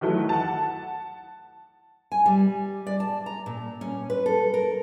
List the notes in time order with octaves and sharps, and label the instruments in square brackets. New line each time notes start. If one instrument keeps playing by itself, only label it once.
[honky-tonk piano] D#3 E3 F#3 A3
F#5 A5
[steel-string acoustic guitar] G#5
G3
D5
A5
A#5
A#2
C#4
B4
A4
A#4